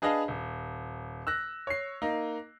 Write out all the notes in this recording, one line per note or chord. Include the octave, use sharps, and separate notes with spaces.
D4 G#4 B4 D#5 F5 A5
D#1
E6 F#6 A#6
C#5 C7
A#3 D#4